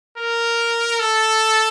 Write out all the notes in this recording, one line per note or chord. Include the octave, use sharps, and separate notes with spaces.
A#4
A4